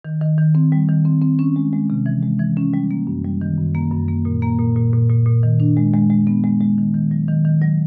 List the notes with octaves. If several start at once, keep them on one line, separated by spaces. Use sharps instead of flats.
D#3
D#3
D#3
C4
G3
D#3
C4
C4
C#4
G#3
G#3
C3
E3
G#3
E3
C#4
G3
A#3
F#2
G3
D#3
F#2
A#3
F#2
A#3
A#2
A#3
A#2
A#2
A#2
A#2
A#2
D#3
D4
G#3
G#3
G#3
B3
G#3
G#3
D#3
D#3
F#3
D#3
D#3
F#3